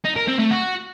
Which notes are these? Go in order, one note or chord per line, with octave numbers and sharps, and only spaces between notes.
D#4
A#4
C4
A3
F#4